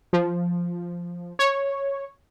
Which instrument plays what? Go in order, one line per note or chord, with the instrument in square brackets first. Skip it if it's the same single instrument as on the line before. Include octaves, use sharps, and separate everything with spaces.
[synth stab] F3
C#5